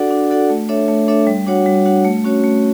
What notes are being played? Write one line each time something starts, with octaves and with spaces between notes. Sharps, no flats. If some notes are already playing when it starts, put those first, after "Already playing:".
Already playing: D4 F#4 A4 D5 F#5
D4
F#4 A4 D5 F#5
A3
D4 A4 C#5 E5
A3
D4 A4 C#5 E5
G3
D4 F#4 C#5 F#5
G3
D4 F#4 C#5 F#5
A3
C#4 F#4 C#5
A3